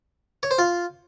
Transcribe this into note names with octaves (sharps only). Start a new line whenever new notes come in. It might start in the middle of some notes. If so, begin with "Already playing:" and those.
C#5
C5
F4